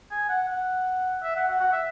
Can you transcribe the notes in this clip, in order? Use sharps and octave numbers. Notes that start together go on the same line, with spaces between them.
G#5
F#5
F#5
E5
F#5
F#5
F#5
E5